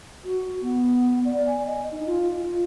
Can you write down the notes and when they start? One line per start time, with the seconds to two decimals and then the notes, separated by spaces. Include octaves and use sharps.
0.24 F#4
0.62 B3
1.25 D5
1.46 G#5
1.66 D#5
1.92 D#4
2.06 F4
2.40 F4